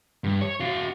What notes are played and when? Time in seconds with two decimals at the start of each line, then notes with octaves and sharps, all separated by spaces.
0.24 G2
0.41 C#5
0.60 F#4 F5